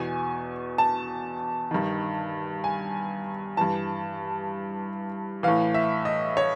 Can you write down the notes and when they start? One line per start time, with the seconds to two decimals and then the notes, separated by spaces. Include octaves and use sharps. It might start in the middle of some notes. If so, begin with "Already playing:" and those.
Already playing: E2 B2 G#5
0.78 A5
1.71 G2 D#3
2.64 G#5
3.57 G2 E3 A5
5.43 A2 E3 F5
5.74 E5
6.05 D#5
6.37 C#5